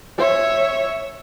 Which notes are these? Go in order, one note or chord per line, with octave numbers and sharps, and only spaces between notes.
C#5 E5